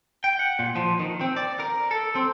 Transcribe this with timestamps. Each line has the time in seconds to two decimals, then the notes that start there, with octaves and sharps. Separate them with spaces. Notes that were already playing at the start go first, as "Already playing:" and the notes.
0.24 G5
0.39 F#5
0.59 A#2
0.76 F3
0.99 D#3
1.21 C4
1.37 D5
1.60 A#4
1.91 A4
2.15 C4